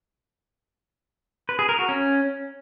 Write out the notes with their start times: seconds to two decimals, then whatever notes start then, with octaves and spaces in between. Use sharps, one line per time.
1.49 B4
1.59 G#4
1.69 A#4
1.79 F#4
1.89 C#4